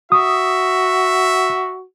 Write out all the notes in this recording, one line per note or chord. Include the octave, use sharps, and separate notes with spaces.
F#4 E5 D#6